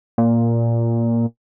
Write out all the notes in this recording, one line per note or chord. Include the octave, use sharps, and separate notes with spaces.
A#2